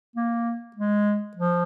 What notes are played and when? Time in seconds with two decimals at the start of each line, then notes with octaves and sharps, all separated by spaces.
0.16 A#3
0.76 G#3
1.37 F3